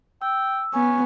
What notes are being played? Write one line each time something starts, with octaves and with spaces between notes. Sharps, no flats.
G5 E6
B3 C#4 G#5